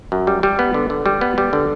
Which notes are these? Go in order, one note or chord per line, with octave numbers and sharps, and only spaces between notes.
F#2
G3
G3
B3
D3
D3
G3
B3
G3
D3